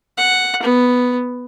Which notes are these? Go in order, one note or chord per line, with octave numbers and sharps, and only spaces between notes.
F#5
B3